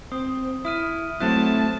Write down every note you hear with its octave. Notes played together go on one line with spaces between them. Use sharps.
C4 D#6
E4 D#6 F6 D#7
F#3 A3 C4 E4 A5 F#6